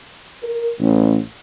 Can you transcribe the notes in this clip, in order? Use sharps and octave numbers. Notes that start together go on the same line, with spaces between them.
A#4
A1